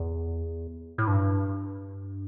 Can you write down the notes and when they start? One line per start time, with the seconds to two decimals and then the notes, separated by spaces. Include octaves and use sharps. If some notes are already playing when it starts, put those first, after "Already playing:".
Already playing: E2
0.98 A2
1.07 G2